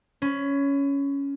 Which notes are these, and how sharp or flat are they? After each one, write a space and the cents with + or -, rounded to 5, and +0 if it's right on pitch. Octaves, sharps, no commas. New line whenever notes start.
C#4 +10 B5 +30